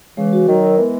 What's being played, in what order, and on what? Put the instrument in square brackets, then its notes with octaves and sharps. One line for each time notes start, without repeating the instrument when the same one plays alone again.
[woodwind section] C#3 E3 [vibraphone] G#3
[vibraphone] F#4
[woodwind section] D#3 F#3 [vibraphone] A#4
[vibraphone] A#4
[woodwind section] E3 G#3 [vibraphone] B3